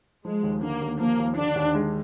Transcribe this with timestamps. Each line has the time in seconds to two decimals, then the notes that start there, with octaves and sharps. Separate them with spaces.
0.25 F3 G#3
0.44 D#2
0.63 D3 A#3
0.82 D#2
1.00 F3 A#3
1.19 D#2
1.37 D3 D4
1.56 D#2
1.75 G#3